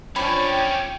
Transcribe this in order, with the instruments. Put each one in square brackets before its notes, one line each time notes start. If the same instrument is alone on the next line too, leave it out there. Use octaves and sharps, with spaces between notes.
[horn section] F3 D4 C#5 [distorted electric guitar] C#4 D5 [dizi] G5 [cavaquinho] B5